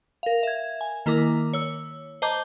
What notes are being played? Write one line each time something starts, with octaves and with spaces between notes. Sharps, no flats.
A#4 F5
E5 G#6
G#5
D#3 A#3 E4 A#4 A#5 D6
C#5 E6
C5 D#5 A5 A#5 D6 G6